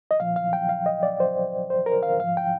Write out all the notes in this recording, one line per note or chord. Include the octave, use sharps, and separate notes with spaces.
D#5
A#2 F3 F5
F5
G5
F5
D#5
D5
C5
C5
A#4
F5
G#2 F3 F5
G5